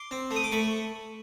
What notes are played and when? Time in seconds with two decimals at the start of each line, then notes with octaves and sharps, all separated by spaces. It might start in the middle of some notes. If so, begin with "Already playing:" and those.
Already playing: C6 D6
0.11 C4
0.31 A3
0.36 D#6
0.44 D6
0.52 A3 B5 C#6